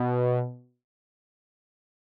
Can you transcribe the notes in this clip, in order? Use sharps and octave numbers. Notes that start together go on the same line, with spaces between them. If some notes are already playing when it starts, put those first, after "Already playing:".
Already playing: B2